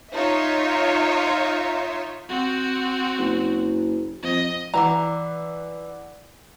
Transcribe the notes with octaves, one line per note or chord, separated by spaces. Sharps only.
D#4 F4 C#5 E5
C4 F#4
F#1
F2 D#5
E3 D5 F#5 A#5 D6